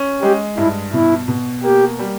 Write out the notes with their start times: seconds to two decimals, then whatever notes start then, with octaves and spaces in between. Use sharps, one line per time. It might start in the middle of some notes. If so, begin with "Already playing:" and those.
Already playing: C#4
0.22 G#3 G4
0.57 G2 E4
0.93 B2 E4
1.28 B2
1.63 A#3 G4
1.99 G3